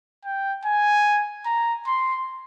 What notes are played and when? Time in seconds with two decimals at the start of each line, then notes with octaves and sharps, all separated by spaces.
0.25 G5
0.66 G#5
1.46 A#5
1.87 C6